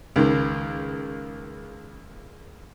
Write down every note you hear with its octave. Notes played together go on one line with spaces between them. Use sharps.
C#2 D#3